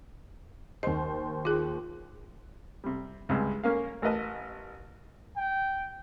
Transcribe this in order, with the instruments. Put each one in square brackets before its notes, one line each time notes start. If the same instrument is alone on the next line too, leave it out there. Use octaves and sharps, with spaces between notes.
[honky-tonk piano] D#2 C5 [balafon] D#5
[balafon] F4 G#4
[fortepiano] C3 G3
C#2 G2 C3 G#3
A#3 C#4 A#4 F5
A1 A#4 B4 D#5 A5
[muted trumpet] G5